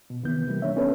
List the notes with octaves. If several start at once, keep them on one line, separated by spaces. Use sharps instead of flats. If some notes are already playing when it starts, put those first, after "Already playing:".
B2
D#2 C3 D#3 E3 B3 G6
C3 E3 G3 A#3
D4 C#5 E5
B3 C#4 D4 A4 B4 C#5